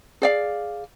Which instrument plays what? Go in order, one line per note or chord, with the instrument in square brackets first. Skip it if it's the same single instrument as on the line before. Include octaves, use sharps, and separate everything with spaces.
[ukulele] G#4 D5 F5